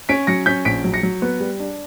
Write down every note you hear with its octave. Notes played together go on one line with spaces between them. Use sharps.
C#4 B6 D7
F#3 A#6 C#7
C#4 G6 B6
A#1 B6 D7
F#3
A#6 C#7
F#3
B3
G3
D4